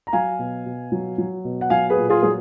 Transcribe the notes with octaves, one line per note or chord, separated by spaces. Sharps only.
A#5
F#3 F5 G#5
B2
B2
F#3
F#3
B2
F#5
F#3 F5 G#5
G#4 B4
A#2
F4 G#4
F#3 G#4